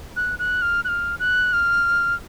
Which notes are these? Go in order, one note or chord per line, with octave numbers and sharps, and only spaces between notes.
F#6
F#6
F6
F#6
F6
F#6
F6